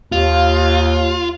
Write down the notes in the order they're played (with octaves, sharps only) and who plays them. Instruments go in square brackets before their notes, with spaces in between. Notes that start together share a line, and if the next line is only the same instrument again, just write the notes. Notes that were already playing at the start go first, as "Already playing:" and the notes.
[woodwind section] D#2 [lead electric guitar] F4